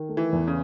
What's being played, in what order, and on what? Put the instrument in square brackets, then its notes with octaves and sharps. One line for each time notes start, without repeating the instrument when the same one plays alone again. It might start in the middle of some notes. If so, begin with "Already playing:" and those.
Already playing: [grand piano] D#3
A3
[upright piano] E3
[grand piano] E2
[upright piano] C#3